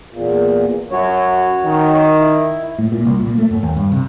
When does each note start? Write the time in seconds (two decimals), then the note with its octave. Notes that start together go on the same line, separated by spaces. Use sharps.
0.11 E2 A#2
0.92 F#2 F#4 C#5
1.64 D#3
2.18 E4
2.78 A2
2.92 A#2
3.05 C2
3.20 A#2
3.38 A3
3.51 F#2
3.63 D#2
3.76 G2
3.92 C3